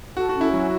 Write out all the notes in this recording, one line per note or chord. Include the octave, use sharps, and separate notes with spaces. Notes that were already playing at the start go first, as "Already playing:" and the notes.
F#4 A4
F#4
C#4
E4
F#3 F#4